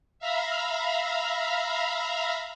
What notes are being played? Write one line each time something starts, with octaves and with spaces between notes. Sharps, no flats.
E5 F5 A#5 B5